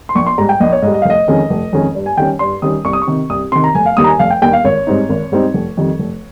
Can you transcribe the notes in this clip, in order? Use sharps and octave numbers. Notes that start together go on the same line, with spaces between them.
C6
A#1 C#6
C6
G#2 G3 A#5
G5
A#1 D#5
C#5
G#2 G3 D#5
D#5
F5
F1 D#5
F2 D#3 G#3 C#4
F1
F2 D#3 G#3 C#4
G2
G#5
D#3 G3 C#4 G5
G2 C6
D#3 G3 C#4 D#6
C2 C#6
D#6
C#6
C3 D#3
C2 D#6
C3 D#3 C6
A#5
F1 G#5
F5
D#2 D#3 G3 D#6
A#5
G#5
F1 F5
G5
D#2 D#3 G3 G5
F5
G#1 C#5
G#2 G3 C4 D#4
G#1
G#2 G3 C4 D#4
F1
F2 D#3 G3
F1